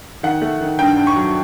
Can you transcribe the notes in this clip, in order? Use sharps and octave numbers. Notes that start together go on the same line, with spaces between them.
D#3 F#5
A3
D#3
G2 G5
G2
C#6
F#3